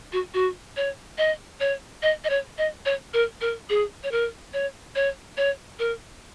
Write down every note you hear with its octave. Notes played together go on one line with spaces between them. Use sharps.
F#4
F#4
C#5
D#5
C#5
D#5
D#5
C#5
D#5
C#5
A#4
A#4
G#4
C#5
A#4
C#5
C#5
C#5
A#4